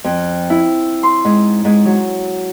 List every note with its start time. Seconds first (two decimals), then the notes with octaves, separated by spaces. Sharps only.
0.04 F2
0.50 E4
1.03 C6
1.25 G#2
1.65 G#2
1.85 F#3